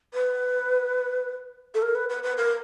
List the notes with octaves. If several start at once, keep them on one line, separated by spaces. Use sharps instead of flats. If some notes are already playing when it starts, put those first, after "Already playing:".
B4
A4
A#4
B4
B4
B4
A#4